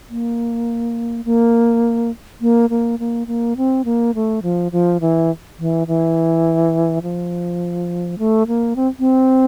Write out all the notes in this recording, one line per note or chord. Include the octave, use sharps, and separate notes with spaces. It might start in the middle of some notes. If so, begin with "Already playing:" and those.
A#3
A#3
A#3
A#3
A#3
A#3
C4
A#3
A3
F3
F3
E3
E3
E3
F3
A3
A#3
C4
C4